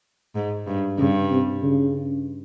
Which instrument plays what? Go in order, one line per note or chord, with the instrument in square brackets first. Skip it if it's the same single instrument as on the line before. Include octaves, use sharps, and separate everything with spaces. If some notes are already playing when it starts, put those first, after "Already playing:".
[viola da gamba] G#2
G2
[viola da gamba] G2 [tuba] C#3
[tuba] C3
C#3